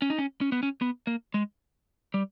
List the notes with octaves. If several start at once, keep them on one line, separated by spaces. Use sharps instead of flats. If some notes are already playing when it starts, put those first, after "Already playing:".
C#4
D#4
C#4
C#4
B3
C#4
B3
A#3
G#3
G3